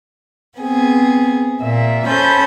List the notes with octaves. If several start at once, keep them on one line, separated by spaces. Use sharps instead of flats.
B3 C4 G#4
A#2 E5
C#4 A4 C5 B5 G6